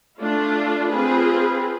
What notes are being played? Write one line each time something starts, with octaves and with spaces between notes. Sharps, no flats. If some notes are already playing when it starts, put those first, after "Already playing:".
A3 D4 F4
C4 F4 G#4 B4